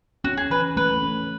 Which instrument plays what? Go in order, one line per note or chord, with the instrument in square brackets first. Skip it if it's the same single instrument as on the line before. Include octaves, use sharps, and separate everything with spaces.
[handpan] C#4 [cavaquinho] F#4
[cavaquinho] G#4
[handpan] E3 [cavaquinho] B4
[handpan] A3 [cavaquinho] B4
[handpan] C#4